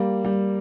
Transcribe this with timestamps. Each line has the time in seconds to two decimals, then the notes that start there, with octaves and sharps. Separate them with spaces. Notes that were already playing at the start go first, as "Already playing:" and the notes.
Already playing: G3 A#3
0.25 G3